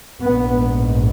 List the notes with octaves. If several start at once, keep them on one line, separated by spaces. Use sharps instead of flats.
A#1 G#2 B3